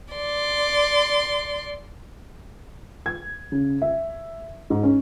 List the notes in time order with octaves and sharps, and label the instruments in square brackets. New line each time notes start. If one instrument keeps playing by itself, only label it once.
[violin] D5 C6
[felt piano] G#6
C#3
E5
G#2
C#4